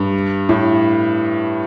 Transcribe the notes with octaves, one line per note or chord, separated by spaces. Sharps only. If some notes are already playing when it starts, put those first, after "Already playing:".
Already playing: G2
A2